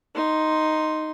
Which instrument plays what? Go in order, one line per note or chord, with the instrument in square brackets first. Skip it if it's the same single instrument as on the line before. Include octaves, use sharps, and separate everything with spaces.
[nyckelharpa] D#4 C6